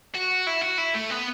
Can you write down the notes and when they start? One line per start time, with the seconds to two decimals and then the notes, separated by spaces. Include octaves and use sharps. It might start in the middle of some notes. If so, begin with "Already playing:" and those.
0.15 F#4
0.47 E4
0.62 F#4
0.78 E4
0.94 A3
1.10 B3